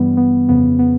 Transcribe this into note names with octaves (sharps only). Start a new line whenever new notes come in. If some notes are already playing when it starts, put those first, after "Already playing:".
Already playing: G2 E3 G3 B3
B3
F2 C#3 F3 B3
B3